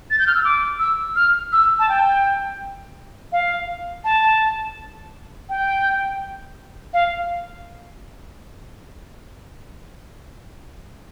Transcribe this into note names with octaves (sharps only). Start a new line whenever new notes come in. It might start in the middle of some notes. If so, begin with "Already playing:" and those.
A6
G6
F6
E6
D6
E6
F6
E6
A5
G5
F5
A5
G5
F5